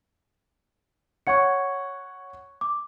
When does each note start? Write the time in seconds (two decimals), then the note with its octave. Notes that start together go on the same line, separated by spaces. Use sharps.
1.27 C#5 F#5 C#6 G#6 C#7
2.61 D6